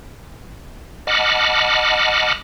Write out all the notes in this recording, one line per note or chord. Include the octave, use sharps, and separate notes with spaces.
D#5 F#5 A5 B5 D6 F6